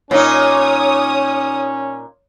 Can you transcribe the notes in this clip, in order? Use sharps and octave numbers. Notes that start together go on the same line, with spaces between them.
A#2 C#4 D#4 C#5 D#6